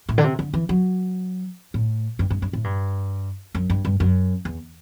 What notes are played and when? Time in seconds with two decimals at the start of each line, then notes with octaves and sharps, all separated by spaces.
0.09 A2
0.18 D3
0.24 C3
0.39 D3
0.54 E3
0.69 F#3
1.74 A2
2.19 G2
2.30 G2
2.42 G2
2.53 A2
2.64 G2
3.55 F#2
3.70 G2
3.85 G2
4.00 F#2
4.45 E2